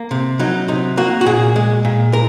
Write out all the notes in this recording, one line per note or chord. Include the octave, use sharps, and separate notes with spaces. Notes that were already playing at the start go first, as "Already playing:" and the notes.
Already playing: A#3
C3
F#3 D#4
C3 D#4
A#3 F#4
F#4
A#2 G#4
G#3
A#2
A#4